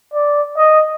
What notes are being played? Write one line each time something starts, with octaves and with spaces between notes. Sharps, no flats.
D5
D#5